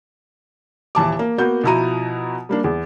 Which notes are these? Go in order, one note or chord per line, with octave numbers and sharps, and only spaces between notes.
D#1 E3 A5 D6
A#3
A#3 B3 F#4 G6
B2 F3 E4 F#4 A#5 D#7
G3 A#3 D4
E2